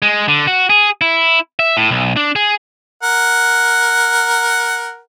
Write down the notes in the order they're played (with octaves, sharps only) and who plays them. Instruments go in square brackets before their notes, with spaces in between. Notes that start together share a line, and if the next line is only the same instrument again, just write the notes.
[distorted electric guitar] G#3
D3
F#4
G#4
E4
E5
A2
B1
D4
G#4
[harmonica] A#4 F#5